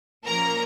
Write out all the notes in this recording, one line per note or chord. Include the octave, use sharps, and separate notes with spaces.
A#2 F3 A#3 C#4 A#4 A#5